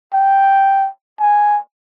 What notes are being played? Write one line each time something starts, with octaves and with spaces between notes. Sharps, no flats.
G5
G#5